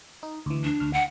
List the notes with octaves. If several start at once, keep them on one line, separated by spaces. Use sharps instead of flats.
D#4
D2 E3
D4
D2 F6
F#5